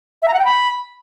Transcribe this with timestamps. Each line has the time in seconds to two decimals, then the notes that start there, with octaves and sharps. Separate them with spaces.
0.22 E5
0.28 A#5
0.34 F#5
0.39 G5
0.45 B5